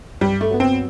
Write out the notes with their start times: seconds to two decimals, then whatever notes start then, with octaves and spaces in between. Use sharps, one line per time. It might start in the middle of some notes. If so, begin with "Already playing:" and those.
0.21 G2 G3
0.41 A3
0.51 F#3 B3
0.60 C4